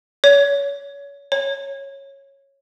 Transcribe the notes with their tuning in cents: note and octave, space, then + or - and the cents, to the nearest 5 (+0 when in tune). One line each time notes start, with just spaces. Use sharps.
C#5 +30
C#5 -10